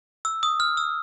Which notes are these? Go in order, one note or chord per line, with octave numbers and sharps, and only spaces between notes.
E6
D#6
F6
E6